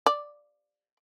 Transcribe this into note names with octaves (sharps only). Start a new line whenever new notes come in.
D5